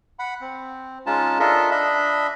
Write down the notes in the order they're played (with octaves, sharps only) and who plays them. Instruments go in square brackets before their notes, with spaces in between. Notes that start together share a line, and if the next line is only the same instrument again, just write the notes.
[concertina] F#5 B5
C4
G#3 C#4 D#4 F4 A5
D4 F4 A4 A#4 D#5 E5
D4 D#5 E5 B5